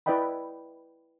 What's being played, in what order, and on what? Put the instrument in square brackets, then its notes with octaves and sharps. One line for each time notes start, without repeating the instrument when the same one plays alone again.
[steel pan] E4 B4 D5 D#5 G5 B5